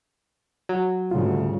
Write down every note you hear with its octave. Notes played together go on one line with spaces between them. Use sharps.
F#3
D2 G#2 C#3 G3 F4